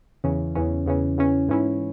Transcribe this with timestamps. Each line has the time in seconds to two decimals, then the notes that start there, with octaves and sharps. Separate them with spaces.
0.24 E2 C#3 E3 C#4
0.55 E2 C#3 E3 C#4
0.86 E2 C#3 E3 C#4
1.17 E2 C#3 E3 C#4
1.48 G#2 E3 C#4 E4